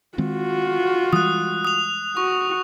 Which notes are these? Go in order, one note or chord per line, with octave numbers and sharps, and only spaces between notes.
D#3 G#3 C4 F4 F#4
E3 G3 G#3 D#6 F#6
D#6 F7
F#4 C#6